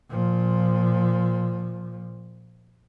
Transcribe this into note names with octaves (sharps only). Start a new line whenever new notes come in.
A#2 F3